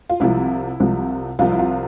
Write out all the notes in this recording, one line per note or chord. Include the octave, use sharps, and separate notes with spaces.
F4
C2 C3 F3 E4
C2 C3 F3
C2 C3 F3 F4
E4
F4